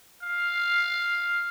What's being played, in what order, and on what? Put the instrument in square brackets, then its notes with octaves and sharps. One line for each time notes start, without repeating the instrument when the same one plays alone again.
[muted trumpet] F5